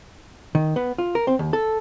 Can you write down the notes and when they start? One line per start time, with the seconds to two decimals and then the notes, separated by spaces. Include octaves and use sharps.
0.55 D#3
0.76 B3
0.98 F4
1.15 A#4
1.27 C4
1.39 D#2
1.53 A4